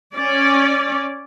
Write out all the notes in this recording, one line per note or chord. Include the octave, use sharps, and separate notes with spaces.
C#4 D5